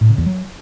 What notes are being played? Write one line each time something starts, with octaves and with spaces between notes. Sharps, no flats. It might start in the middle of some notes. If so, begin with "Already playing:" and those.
A2
C#3
E2
F#3